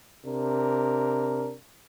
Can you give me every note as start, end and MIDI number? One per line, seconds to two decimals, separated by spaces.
0.24 1.53 48
0.24 1.53 62
0.24 1.53 70